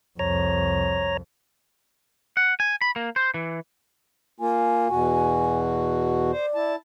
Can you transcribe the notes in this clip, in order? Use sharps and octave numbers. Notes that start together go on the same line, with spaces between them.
C2 F2 C#5 A#5
F#5
G#5
B5
A#3
C5
E3
A#3 F4 G#5
E2 B2 F#4
C5 D5
E4 A5